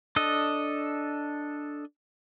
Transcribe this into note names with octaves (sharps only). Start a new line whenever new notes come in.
D4 A4 D#5